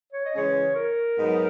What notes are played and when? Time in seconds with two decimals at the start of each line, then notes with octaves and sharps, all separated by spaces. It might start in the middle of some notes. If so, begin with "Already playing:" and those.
0.13 C#5
0.25 D#5
0.34 C#3 E3 G#3 C#4 G#4 C#5
0.75 A#4
1.17 G#2 F#3 B3 D#4